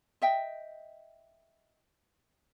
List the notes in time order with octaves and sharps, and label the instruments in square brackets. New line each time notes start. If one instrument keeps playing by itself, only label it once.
[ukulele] D#5 E5 G5